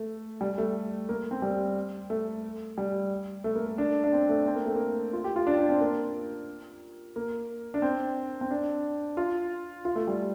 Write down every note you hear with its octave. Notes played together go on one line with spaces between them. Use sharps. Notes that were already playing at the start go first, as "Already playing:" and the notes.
Already playing: A3
G3
A3
A#3
C4
G3
A3
G3
A3
A#3
A#3
D4
D4
C4
A3
C4
A#3
A3
A#3
F4
G4
F4
D4
D4
C4
A#3
A#3
D4
C4
C4
D4
F4
F4
A3
G3